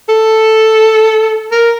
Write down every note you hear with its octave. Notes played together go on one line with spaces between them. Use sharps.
A4
A#4